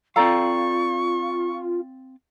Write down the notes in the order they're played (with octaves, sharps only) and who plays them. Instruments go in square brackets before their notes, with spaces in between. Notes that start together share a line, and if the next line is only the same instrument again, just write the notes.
[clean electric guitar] C4 D5 F5 [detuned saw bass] F4 [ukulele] A4 A#5 [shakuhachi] C#6